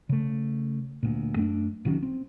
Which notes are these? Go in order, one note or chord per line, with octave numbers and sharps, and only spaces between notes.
C#3 A3
D2 A#2
F#2 A3 D4
A#1 D#3 F#3 C#4
C4